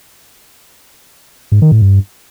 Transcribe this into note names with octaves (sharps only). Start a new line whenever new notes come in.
G#2
D#3
A2
G2